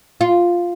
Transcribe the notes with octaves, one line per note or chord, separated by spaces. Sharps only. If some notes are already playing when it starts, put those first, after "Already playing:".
F4